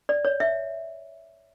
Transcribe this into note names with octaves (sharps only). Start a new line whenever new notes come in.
D5
C#5
E5